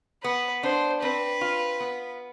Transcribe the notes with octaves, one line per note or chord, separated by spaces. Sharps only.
B3 B4
D4 C5
C4 B4
F4
B3